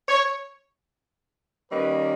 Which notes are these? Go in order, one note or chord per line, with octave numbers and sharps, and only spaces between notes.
C#5
D#3 G3 A#3 C#4 B4